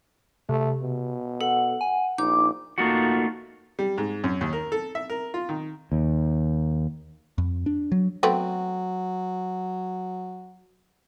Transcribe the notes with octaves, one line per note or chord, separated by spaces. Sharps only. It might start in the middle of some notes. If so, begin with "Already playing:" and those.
C3 A3
B2
A4 F#5
G#5
A#1 D#4 D6
A3 A#3 D#4 F4 F#4 F#5
G3
G#2
F#2
D#2
A#4
A4
E5
A#4
F4
D#3
D#2
F2
D4
F#3
F#3 A3 B3 C4